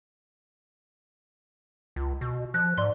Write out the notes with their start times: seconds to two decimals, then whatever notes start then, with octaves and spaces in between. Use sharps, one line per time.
1.96 C#2
2.21 B2
2.54 F3 F#6
2.78 G#2 D5 C6 G7